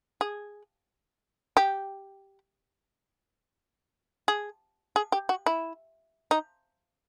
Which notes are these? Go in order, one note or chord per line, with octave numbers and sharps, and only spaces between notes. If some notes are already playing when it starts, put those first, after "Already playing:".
G#4
G4
G#4
G#4
G4
F#4
E4
D#4